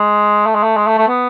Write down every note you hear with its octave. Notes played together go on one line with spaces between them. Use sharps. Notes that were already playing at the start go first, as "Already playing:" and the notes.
Already playing: G#3
A3
G#3
A3
G#3
A3
A3
B3